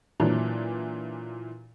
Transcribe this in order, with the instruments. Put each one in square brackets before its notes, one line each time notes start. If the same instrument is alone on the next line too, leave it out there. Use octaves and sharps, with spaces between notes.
[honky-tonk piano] A#2 E3 F#3 D4